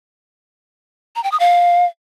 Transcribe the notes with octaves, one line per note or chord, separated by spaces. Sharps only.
A#5
G5
D#6
F5